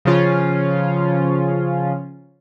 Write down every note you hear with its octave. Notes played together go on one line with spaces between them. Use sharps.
C#3 F3 C#4 F4